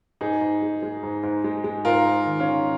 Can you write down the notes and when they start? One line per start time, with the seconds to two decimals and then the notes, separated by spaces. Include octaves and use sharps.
0.21 G#2 D#4 G#4
0.41 G#2
0.62 G#3
0.83 G#3
1.03 G#2
1.23 G#2
1.44 G#3
1.64 G#3
1.85 G#2 F4 A#4
2.05 G#2
2.26 D#3
2.40 C#4 F4
2.47 D#3